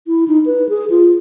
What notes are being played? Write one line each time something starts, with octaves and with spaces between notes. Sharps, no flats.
E4
D#4
B4
G#4
F4